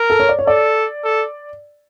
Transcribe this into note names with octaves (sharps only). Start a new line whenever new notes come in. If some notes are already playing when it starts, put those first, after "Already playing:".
Already playing: A#4
A4
C#5
D5
C#5
A4 D5
A4